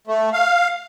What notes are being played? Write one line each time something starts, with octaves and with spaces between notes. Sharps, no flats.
A3
F5